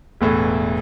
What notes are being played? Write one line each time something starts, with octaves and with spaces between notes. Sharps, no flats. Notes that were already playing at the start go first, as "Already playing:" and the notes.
E1 E2 A2